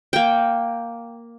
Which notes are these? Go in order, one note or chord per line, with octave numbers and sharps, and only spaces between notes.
A#3 G5